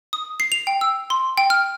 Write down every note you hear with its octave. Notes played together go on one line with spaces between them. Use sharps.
D#6
C7
F7
G5
E6
C6
G5
F6